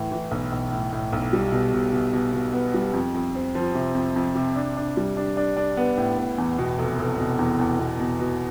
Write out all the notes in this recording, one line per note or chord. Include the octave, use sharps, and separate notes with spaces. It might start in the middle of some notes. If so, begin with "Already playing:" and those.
Already playing: A2 E3
E3
B1
B1
A2
A2
B1
G3
B2
B2
B2
B2
B2
B3
G3
F2
F2
C4
F3
C3
F2
F2
C3
D4
D4
G3
D4
D4
D4
B3
A2
B3
E2
B2
F1
F1
B2
E2
E2
B2
B2
B2